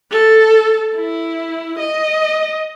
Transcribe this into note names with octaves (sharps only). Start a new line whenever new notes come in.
A4
E4
D#5